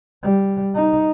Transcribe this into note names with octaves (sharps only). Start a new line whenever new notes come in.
G3
D#4